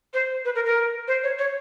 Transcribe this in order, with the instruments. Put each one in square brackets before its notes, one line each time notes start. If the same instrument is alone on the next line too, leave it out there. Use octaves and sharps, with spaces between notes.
[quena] C5
B4
A#4
A#4
C5
C#5
C#5